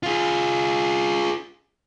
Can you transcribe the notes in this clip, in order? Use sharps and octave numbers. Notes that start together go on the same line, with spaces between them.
F4 G#4